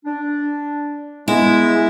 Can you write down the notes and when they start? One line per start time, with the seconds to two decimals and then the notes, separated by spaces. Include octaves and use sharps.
0.05 D4
1.28 G#3 B3 E4